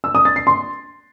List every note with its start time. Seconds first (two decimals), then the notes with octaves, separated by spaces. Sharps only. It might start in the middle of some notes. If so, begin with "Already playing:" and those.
0.04 E6
0.15 D#6
0.25 A6
0.36 C7
0.47 C6